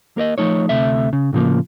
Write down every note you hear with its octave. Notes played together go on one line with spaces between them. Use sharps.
A#3 A#4 D5 D#5
F3 A3 D#4 C#5
D2 C3 A3 E5
C#3
A2 C#3 F3 A#3